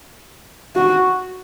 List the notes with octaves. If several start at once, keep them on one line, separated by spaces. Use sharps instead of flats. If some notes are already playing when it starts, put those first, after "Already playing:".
F#4